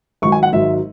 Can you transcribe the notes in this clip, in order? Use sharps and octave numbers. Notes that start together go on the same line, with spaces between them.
G#1 G#2 F#3 C#6
G#5
F#5
G#1 G#2 F#3 E5